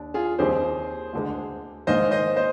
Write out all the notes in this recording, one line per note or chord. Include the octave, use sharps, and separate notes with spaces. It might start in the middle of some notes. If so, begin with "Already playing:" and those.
Already playing: D#2 D4
F4 G#4
D#2 D#3 G3 C4 G4 G#4 C5
D2 D3 G#3
G#2 D#3 A#3 C5 D#5
C5 D#5
C5 D#5